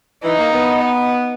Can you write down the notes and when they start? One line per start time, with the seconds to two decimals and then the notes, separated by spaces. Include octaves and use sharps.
0.24 E3 D#4
0.39 A#3
0.53 B3